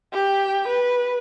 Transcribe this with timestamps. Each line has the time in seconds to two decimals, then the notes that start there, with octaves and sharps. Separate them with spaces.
0.13 G4 G5
0.68 B4